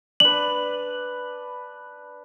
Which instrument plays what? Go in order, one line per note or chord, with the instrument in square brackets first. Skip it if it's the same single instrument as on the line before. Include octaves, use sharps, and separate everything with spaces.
[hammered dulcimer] D4 B4 [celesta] F#7